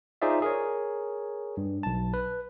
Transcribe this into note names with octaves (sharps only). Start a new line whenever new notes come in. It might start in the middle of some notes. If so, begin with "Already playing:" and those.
D#4 F4 G#4 C5 D5 E5
G#4 A#4 C#5
G2
B1 A5
B4